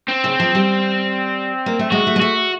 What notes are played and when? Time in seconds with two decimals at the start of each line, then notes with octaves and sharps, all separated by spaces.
0.09 C4
0.24 C#3
0.40 F3
0.55 G3
1.66 A#3
1.79 A3
1.92 G#3 F#4
2.07 A3
2.16 G#3
2.21 A3 F#4